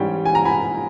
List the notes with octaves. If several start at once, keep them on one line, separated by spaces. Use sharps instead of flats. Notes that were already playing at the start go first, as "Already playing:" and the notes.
Already playing: G#2 E3 G3 C#4 G5
G#5
A#5
G#5 B5